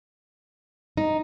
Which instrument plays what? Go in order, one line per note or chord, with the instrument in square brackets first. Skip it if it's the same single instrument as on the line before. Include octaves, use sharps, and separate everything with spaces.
[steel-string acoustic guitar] D#4